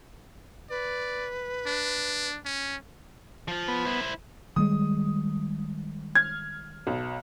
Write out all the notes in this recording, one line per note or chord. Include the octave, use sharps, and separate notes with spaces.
B4 D5
D4
C#4
F3 F4
B3
E4 C5
D#3 G3 G#3 D#6
F6 G#6
B1